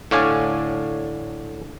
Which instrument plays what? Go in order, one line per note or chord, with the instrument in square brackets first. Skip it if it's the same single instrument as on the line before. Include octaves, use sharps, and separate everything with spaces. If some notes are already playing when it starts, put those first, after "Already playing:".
[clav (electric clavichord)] A2 D3 C#5 D5 F5 G#5